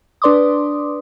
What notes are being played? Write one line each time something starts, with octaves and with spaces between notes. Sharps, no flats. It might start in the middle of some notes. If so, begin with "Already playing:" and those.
D4 B4 D5 C6 D6 D#6